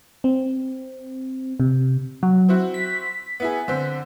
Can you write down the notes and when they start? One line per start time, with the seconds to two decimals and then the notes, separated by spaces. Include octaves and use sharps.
0.24 C4
1.60 C3
2.23 F#3
2.49 C4 E4 F#4
2.74 B6
3.40 B3 E4 G#4
3.68 D3 C4